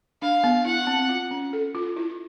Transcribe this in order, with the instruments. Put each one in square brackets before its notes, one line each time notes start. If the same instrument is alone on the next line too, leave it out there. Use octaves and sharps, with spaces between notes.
[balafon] D4 [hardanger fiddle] F5
[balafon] B3
[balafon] E4 [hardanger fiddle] F#5
[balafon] C4
F4
C#4
A4
F4
E4